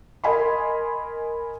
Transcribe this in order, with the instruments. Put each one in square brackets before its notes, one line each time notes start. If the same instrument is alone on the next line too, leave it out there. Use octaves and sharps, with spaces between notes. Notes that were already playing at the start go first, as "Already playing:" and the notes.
[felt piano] A#4 D#5 G#5 B5 C6